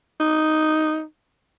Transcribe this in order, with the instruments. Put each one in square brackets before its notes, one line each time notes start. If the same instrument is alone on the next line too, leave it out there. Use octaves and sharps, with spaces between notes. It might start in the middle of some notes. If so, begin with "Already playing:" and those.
[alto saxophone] D#4